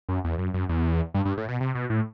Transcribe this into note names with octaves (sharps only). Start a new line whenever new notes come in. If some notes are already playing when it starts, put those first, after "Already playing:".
F#2
E2
F#2
F#2
E2
G2
G2
A2
B2
C3
B2
A2